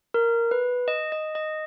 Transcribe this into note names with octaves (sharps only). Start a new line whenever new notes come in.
A#4
B4
D#5
D#5
D#5